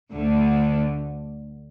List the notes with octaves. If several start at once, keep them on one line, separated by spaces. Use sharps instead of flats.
D2 D3 A3